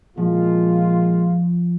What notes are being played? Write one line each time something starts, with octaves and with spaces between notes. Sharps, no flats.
A#2 F3 G#3 F4